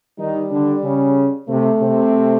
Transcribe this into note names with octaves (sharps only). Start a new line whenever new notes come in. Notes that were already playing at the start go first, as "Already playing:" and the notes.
D#3 G3 D#4
D3 D4
C#3 C#4
C3 A3 C4
C3 C4